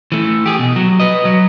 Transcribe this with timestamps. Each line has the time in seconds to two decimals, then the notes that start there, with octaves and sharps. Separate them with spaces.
0.12 E3 A3
0.46 G4 G#4
0.59 B2
0.76 F#3
1.00 B4 D#5
1.25 F#3